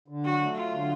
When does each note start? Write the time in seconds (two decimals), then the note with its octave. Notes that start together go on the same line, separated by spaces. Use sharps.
0.08 D3
0.24 F#3 F#4
0.40 A3
0.56 F#3 F4
0.72 D3